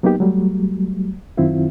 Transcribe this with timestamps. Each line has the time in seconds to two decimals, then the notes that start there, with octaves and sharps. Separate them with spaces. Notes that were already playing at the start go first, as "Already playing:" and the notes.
0.03 F#3 A#3 B3 D#4 G4
0.20 F#3 G3 A3
1.37 F#2 D#3 C4 E4 F4